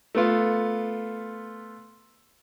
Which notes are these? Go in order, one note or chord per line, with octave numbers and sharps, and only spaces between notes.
A3 B3 F4